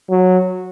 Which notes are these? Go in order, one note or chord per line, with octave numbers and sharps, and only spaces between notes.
F#3